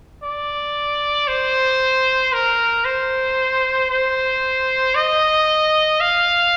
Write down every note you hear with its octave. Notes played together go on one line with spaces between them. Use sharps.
D5
C5
A#4
C5
C5
D#5
F5